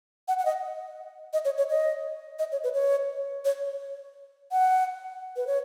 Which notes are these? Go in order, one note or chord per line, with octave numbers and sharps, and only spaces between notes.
F#5
F#5
D#5
D#5
C#5
C#5
D#5
D#5
C#5
B4
C#5
C#5
F#5
B4
C#5